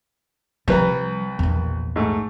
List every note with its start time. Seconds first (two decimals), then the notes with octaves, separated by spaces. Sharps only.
0.68 C2 F3 G3 B4 A#5
1.39 A#1 E2
1.96 G#2 A3